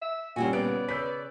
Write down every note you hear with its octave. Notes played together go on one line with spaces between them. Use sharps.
E5
D#2 A#2 G3 C4 C#4 F#4 G#5
C#3 B3 D5 F#6 D7
C#3 B4 E6 G6 B6